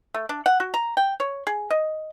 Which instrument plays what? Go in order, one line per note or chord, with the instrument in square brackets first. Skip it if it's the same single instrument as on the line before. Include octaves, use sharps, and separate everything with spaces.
[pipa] A3
D4
F#5
F#4
A#5
G5
C#5
G#4
D#5